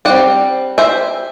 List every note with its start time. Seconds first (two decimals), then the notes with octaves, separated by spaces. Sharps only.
0.05 G3 C4 D5 F#5
0.78 C5 E5